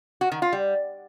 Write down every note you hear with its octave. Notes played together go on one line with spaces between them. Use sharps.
F#4
D#3
F4
G3